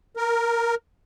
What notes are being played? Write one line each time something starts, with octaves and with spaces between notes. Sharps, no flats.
A#4